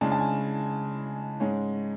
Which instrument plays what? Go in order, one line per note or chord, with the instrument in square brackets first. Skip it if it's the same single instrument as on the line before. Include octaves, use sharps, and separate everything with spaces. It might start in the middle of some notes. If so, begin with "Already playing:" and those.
[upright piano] C#3 G#3 D4 A5
A5
G#5
G#2 G#3 C#4